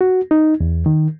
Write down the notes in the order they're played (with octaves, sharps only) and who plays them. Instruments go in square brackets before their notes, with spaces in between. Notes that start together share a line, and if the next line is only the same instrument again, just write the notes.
[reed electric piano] F#4
D#4
E2
D#3